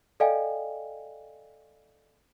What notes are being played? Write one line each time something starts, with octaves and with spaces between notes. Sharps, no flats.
A4 D5 D#5 F5 G5 G#5